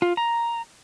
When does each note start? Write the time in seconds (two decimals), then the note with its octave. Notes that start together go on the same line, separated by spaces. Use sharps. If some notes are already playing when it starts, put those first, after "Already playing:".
0.02 F4
0.17 A#5